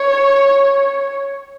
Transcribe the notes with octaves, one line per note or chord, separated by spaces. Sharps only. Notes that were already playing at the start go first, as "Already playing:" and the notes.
Already playing: C#5